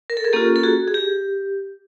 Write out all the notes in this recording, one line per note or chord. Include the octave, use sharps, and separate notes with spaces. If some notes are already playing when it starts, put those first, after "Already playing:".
A#4
A4
G#4 A#4
A#3 C#4 F4 G4 A4
A4
F#4 G#4
G#4
G4